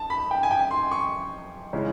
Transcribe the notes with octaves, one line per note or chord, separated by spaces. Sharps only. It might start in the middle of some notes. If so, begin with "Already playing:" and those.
Already playing: A5
B5
G5
G#5
G5
C6
C#6
C#3 E3 G#3 C#4